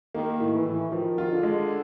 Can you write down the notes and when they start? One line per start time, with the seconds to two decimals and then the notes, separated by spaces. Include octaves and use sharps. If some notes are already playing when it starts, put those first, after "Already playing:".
0.15 D#3 A#3
0.40 A2
0.53 E3
0.66 A2
0.91 D#3 F3
1.18 F4
1.31 D3
1.43 G#3